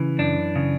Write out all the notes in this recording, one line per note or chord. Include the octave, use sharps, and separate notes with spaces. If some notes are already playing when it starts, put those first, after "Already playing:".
Already playing: C#3 E3
F#2 D4
C#3